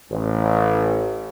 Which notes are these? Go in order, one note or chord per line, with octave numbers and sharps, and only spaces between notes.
A1